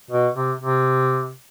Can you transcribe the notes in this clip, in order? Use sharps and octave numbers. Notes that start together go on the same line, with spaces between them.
B2
C3
C3